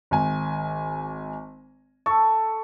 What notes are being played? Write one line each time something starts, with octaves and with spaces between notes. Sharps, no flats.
G#1 G#5
A4 C#6